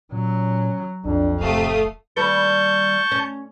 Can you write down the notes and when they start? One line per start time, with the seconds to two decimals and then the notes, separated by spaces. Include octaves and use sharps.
0.12 A#2 F#3 C#4
1.05 B1 F2 D4
1.41 D1 C3 A3 F5 D#6
2.17 D#2 G3 B4 A5 C#6 G6
3.12 C#4